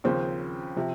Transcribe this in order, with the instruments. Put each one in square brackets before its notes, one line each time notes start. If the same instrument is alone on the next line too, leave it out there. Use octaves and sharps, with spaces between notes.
[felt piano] D#2 C#3 F3 C4
C3 F3